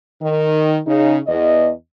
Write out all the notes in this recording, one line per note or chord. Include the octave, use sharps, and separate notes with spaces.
D#3
C#3 D#4
E2 D#5